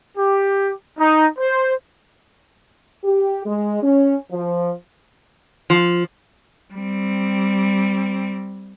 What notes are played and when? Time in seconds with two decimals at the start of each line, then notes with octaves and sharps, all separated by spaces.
0.17 G4
0.99 D#4
1.39 C5
3.04 G4
3.45 G#3
3.82 C#4
4.31 F3
5.70 F3
6.74 G3 C4